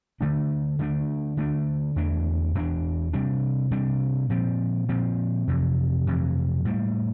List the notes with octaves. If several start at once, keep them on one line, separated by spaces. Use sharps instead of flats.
D3 A3 D4
D3 A3 D4
D3 A3 D4
E2 E3 A3 D4
E2 E3 A3 D4
C3 G3 D4
C3 G3 D4
A#2 F3 C4
A#2 F3 C4
F2 C3 E3
F2 C3 E3
A2 G3 A#3